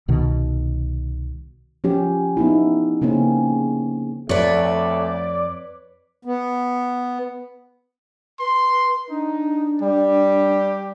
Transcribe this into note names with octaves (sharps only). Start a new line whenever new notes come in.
C2 B2 D#3
F3 C#4 G4
B3 D#4 E4
C#3 A#3 C4 C#4
F2 A3 B4 C#5 D5
B3
B4 C6
D4 D#4
G3 G4